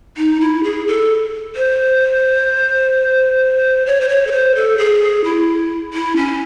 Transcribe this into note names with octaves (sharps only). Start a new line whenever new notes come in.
D#4
E4
G#4
A4
C5
C#5
C5
C#5
A4
C5
A4
G#4
E4
E4
C#4